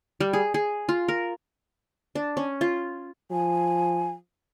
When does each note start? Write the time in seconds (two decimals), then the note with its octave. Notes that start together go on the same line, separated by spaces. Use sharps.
0.20 G3
0.33 G#4
0.54 G#4
0.89 F4
1.08 A#4
2.15 D4
2.37 C#4
2.61 F4
3.31 F3 G#5